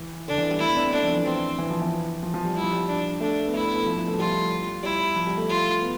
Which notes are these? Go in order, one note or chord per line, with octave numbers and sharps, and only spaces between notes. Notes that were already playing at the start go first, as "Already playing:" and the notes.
Already playing: E3
D3 D4
E3
G3
A3 E4
B3
D4
C4
A3 D4
F3
E3
E3 C4
E3
F3
E3
F3
F3
G3
G3 E4
F3
G3
D4
A3 D4
B3
A3 E4
B3
A3
F3
F3
A3
F3
G3 F4
G3 E4
F3
G3
A3
F4
B3